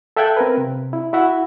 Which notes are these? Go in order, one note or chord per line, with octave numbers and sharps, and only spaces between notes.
A4 E5 F5 G5 F#6 G#6
C4 A#4 B4
C3
E4
E4 F#4 E5 F#5